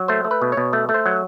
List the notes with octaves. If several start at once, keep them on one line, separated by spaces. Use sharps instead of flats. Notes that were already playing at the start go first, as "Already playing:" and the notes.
Already playing: F#3
A3 C5
A3
B4
B2
C#5
B2
A3
A3
C5
F#3